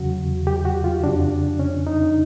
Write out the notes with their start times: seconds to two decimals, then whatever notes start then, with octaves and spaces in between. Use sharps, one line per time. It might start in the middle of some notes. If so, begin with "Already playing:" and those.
Already playing: E2 C#3 F#3 F#4
0.47 G4
0.65 F#4
0.84 F4
1.03 F2 C#3 F3 D4
1.59 C#4
1.87 D#4